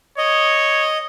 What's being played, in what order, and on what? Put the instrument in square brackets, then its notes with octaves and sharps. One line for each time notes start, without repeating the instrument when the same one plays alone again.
[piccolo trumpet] C#5 [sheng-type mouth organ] D#5